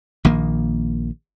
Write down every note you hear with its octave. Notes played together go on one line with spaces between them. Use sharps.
A#1 D#3 A#3